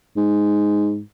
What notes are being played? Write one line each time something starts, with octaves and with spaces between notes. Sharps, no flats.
G#2